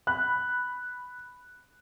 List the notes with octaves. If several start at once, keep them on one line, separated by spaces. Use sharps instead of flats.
B5 F#6